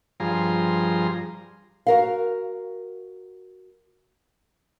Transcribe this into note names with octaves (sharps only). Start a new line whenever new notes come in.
G2 F3 G#4 A#5 C6
F#4 A#4 F5